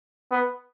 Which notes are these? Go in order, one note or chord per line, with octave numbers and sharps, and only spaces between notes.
B3